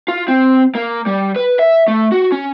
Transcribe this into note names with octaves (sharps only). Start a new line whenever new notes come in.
F4
C4
A#3
G3
B4
E5
A3
F#4
C#4